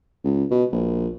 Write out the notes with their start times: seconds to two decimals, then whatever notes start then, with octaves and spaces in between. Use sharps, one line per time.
0.24 C#2
0.51 B2
0.72 A#1